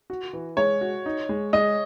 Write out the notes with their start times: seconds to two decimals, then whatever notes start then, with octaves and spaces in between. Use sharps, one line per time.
0.10 F#4
0.33 E3
0.57 G#3 C#5
0.81 F#4
1.06 D#4
1.29 G#3
1.53 G#3 D#5